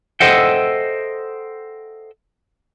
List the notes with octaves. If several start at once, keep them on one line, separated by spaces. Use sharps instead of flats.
A4 C5 D#5 E5 F#5 G5